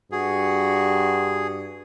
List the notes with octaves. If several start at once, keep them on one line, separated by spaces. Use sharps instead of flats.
G2 F#4 G#4